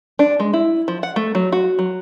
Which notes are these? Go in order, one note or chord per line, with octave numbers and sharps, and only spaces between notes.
D4
G#3
E4
F3
F#5
A3
F#3
F#4
F#3